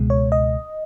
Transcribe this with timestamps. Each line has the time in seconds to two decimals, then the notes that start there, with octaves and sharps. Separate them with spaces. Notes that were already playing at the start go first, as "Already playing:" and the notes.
Already playing: C#2 B2 G#3
0.10 C#5
0.32 D#5